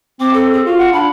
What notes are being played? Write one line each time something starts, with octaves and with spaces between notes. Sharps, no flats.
C4 D6
A4
G#4
F4 F#4
F#5
D4 B5